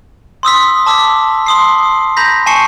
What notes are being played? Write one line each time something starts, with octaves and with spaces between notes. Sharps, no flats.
C6 D#6 E6 B6
A5 D6 E6 B6
C6 D#6 C7
A#5 B5 G6 A#6 B6
G#5 A5 C#6 C7 C#7